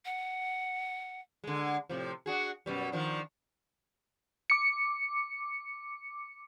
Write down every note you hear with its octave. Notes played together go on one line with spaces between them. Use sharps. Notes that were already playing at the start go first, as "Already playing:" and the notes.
F#5
D3 G#3
A2 C3 F3
D4 F#4 G#4
F#2 B2 G3
D#3 F3 D4
D6 C#7